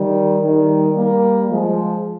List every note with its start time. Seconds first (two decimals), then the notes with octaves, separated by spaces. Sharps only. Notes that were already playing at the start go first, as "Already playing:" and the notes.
Already playing: D#3 G3
0.41 D#3 G3
0.95 G3 A#3
1.49 F3 G#3